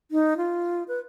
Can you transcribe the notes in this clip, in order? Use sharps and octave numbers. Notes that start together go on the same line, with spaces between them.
D#4
F4
B4